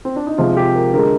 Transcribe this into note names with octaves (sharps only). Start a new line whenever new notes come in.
C4
D4
D#4
C3 F3 G#3 F4
G4
A#4
D3 G#3 A#4